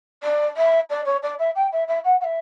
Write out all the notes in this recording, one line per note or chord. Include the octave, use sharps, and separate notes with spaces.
D5
E5
D5
C#5
D5
E5
G5
E5
E5
F#5
F#5
E5